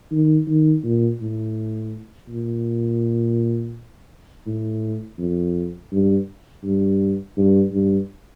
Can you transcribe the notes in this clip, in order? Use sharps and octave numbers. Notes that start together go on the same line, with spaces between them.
D#3
D#3
A#2
A2
A#2
A2
F2
G2
G2
G2
G2